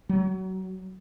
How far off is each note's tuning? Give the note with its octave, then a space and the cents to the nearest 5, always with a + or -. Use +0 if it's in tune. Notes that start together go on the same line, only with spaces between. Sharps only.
F#3 +25